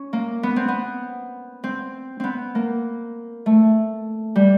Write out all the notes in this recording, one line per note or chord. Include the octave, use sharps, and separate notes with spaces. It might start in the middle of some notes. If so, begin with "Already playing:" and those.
Already playing: C#4
A#3
B3
C4
B3
C4
B3 C4
A#3
A3
G3